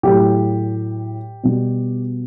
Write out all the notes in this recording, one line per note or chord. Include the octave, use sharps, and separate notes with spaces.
A2 F#3 G4
B2 G3